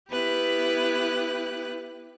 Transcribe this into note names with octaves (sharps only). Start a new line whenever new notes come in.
B3 E4 G4 B4 F#6